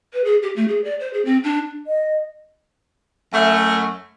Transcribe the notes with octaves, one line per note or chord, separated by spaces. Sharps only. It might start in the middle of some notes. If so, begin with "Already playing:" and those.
B4
G#4
G4
A3
G#4
D5
C5
G#4
C4
D4
D#5
F#2 A3